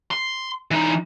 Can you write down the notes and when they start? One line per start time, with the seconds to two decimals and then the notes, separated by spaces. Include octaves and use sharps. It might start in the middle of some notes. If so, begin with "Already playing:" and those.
0.11 C6
0.71 E3 D#4